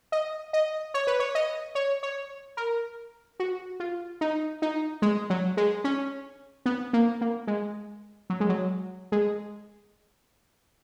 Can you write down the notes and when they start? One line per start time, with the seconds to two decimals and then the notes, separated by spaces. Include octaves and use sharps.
0.12 D#5
0.53 D#5
0.94 C#5
1.07 B4
1.20 C#5
1.35 D#5
1.75 C#5
2.03 C#5
2.57 A#4
3.40 F#4
3.80 F4
4.21 D#4
4.62 D#4
5.02 G#3
5.30 F#3
5.57 G#3
5.84 C#4
6.66 B3
6.93 A#3
7.21 A#3
7.47 G#3
8.30 F#3
8.40 G#3
8.49 F#3
9.12 G#3